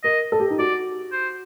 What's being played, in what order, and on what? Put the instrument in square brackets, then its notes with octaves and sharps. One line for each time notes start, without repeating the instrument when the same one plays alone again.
[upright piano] A#4 [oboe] D#5
[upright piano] A4
G4
D#4
[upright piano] F#4 [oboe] D5
[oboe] C5